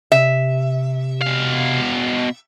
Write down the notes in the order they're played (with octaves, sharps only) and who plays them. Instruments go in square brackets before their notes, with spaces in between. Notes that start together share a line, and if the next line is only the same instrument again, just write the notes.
[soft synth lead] C3 [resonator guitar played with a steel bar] E5
[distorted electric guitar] B2 F5